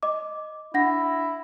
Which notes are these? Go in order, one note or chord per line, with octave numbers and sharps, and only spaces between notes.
D#5 D6
D4 E4 F#5 A#6